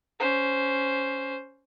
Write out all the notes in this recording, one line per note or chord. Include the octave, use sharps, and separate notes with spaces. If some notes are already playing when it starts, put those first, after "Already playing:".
C#4 C5